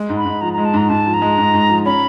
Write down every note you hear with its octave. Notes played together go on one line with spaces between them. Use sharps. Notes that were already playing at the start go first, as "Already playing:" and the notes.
Already playing: G#3
G#2
B5
G#2
F3 A#5
G#3 A#5
A5
G#2 A#5
G#2 A5
F3
A#5
G#3
G#2
G#2
F3
C#4 B5